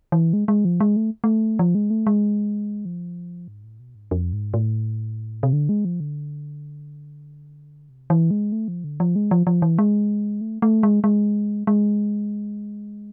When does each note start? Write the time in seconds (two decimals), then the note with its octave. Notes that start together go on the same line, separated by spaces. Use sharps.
0.12 E3
0.33 G#3
0.48 G#3
0.65 F3
0.80 G#3
0.96 A3
1.24 A3
1.59 F3
1.75 G#3
1.90 A3
2.07 G#3
2.85 F3
3.48 G#2
3.64 A2
3.80 B2
3.95 G#2
4.11 F2
4.33 G#2
4.54 A2
5.43 C3
5.53 D3
5.69 G#3
5.85 F3
6.00 D3
7.89 C3
8.10 E3
8.31 G#3
8.52 A3
8.68 F3
8.84 D3
9.00 F3
9.16 G#3
9.31 F3
9.47 F3
9.62 E3
9.79 G#3
10.41 A3
10.62 A3
10.83 G#3
11.04 G#3
11.67 G#3